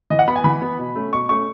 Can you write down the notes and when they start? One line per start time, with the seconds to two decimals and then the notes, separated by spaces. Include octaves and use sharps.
0.10 E3 D#5
0.19 F#5
0.28 B3 B5
0.36 G#5
0.44 E3 B5
0.62 B3
0.79 B2
0.95 A3 C#4
1.12 B2 C#6
1.29 A3 C#4 C#6